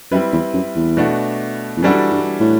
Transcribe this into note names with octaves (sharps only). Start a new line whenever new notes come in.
F#2 G3 C4 E4 B4
E2
F#2
E2
B2 A3 D4 F#4
E2
F#2 E3 G3 D4 F#4 A4
G2
A2